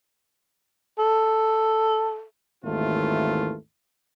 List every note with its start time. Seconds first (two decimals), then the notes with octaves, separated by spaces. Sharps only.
0.98 A4
2.64 G#1 D#2 E3 A3 F4